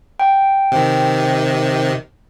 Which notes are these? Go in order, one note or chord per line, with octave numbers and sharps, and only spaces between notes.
G5
C3 D#3